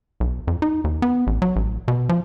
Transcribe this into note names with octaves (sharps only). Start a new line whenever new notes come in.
B1
F2
D#4
D#2
B3
A1
F#3
A1
B2
F3